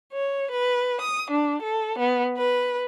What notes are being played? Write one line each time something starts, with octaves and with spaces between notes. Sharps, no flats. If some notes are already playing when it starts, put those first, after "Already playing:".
C#5
B4
D#6
D4
A4
B3
B4